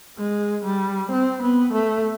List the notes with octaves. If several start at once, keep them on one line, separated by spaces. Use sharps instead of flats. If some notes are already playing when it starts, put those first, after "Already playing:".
G#3
G3
C4
B3
A3